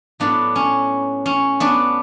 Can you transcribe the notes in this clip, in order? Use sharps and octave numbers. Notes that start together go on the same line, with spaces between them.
A2 F#3 B3 D4
C#4
C#4
B3 D4